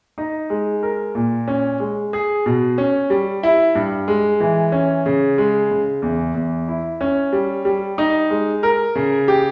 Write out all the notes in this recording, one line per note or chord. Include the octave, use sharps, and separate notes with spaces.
D#4
G#3
A#4
A#2
C#4
G#3
G#4
B2
C#4
G3
E4
G2
G#3
E3
C#4
C#3
G#3
C#3
E2
E2
E4
C#4
G3
G3
D#4
G#3
A#4
C#3
G4